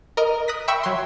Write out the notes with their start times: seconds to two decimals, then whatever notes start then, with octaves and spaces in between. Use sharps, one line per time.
0.17 A#4 D#5
0.48 D#6 F#6 A#6 B6
0.68 E5 G5 B5 C#6 E6
0.83 F#3 C6